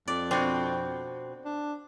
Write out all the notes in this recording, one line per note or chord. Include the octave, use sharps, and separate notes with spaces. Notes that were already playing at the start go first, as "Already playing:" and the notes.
F2 D5
B2 C4 D4
D4